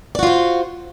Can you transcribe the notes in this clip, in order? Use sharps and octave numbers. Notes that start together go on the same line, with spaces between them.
F4 F#4 C5 D5